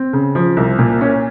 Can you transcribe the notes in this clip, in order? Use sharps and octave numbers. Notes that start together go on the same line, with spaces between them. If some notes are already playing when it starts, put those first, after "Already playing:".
Already playing: C4
C#3
F3
C2
A#2
C#4